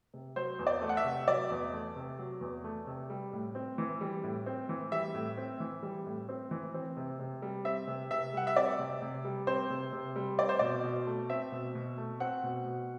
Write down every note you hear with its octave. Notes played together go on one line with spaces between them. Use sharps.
C3
F#3 C5
E2
D5
A3
F#5
E5
C3
F#3 D5
E2
A3
C3
F#3
E2
A3
C3
G3
A2
C4
E3
G3
A2
C4
E3
G3 E5
A2
C4
E3
G3
A2
C4
E3
C4
C3
C3
G3
C4 E5
C3
C3 E5
G3 F#5
E5
C4 D5
C3
C3
G3
C4 C5
C3
C3
G3
C4 D5
C5
B2 D5
B2
A3
C4 E5
B2
B2
A3
C4 F#5
B2
B2